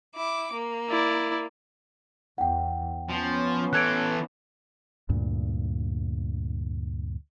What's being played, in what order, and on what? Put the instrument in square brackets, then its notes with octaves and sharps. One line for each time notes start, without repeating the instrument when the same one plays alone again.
[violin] E4 D6
A#3
[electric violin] E4 D5
[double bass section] E2 [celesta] F#5 G5
[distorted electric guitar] F3 [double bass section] B3 C#4
[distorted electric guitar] E3 A4 [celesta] F#6 G#6 D7
[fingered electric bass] D2 G2 A#2